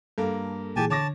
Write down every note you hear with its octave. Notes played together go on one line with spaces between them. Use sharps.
G2 A#3 A4
A#2 E3 G4 G#4 G#5 A5
D3 C#5 A5 D6 A#6